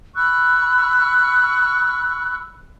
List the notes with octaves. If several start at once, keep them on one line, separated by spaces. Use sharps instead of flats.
B5 C#6 E6 F#6